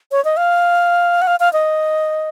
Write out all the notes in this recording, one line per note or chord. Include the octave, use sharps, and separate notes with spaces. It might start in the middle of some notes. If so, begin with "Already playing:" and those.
C#5
D#5
F5
F#5
F5
F5
D#5